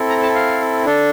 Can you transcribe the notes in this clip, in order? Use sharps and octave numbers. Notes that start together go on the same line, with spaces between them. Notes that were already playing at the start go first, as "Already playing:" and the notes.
Already playing: C4 E4 A4
A#5
A5
F5
D4 A4